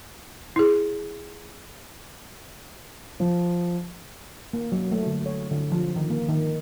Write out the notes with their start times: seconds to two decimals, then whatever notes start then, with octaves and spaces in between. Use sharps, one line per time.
0.56 E4 G#4
3.20 F3
4.53 A#3
4.72 F#3
4.91 A3
5.07 D3
5.26 C#5
5.51 D3
5.72 F3
5.96 D#3
6.10 A#3
6.29 D#3